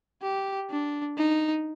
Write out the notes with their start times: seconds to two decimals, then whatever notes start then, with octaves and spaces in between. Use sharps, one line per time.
0.23 G4
0.70 D4
1.18 D#4